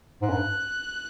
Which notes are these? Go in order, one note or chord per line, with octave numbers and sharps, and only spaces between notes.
G#2
G2 F#6